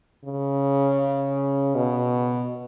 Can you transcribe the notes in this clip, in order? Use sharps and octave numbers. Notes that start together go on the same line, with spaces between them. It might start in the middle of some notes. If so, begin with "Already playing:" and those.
C#3
B2